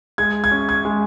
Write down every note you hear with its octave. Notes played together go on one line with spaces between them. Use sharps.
G#3 G#6
G#6
C#4
G#6
G#3